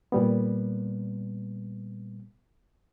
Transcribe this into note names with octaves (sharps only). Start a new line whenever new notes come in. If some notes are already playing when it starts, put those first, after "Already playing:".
A#2 G3 B3